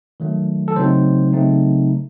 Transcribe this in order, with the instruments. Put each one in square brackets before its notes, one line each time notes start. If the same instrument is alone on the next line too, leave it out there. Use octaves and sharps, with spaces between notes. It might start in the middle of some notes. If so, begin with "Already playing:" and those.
[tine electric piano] D#3 F#3 A3
A4
C#3 F#3 A3 C4 D#4 C5
C#3 F#3 A3 C4 D#4